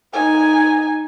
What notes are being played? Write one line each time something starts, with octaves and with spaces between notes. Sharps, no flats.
D#4 G#5